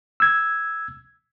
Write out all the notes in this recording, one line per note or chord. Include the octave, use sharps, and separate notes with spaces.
E6 G#6